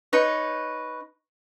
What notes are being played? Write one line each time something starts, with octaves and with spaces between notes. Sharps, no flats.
D#4 B4 C#5